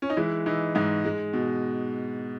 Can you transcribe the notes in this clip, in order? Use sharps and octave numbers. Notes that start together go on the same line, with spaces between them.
C#4
D#4
E3 G#3 E4
E3 D#4
G#2 D#4
G#3
B2